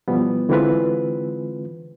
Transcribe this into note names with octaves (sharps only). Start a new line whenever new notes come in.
B2 E3 F3 G3 B3
D3 E3 G#3 C4 F4 B4